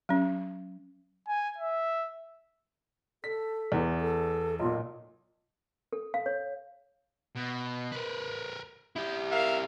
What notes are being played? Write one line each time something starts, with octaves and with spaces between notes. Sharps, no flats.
F#3 C#4
G#5
E5
A4 B6
E2 E3
A4
B1 A#2 F4
A4
F5
C#5
B2
A#4 B4
E4 G4
A#4 E5 F5